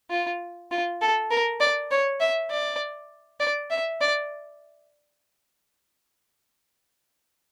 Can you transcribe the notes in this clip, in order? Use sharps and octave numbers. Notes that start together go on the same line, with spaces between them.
F4
F4
A4
A#4
D5
C#5
E5
D5
D5
E5
D5